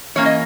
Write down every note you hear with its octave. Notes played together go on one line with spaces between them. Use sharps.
E3 A#3 C#4 C#5
D#5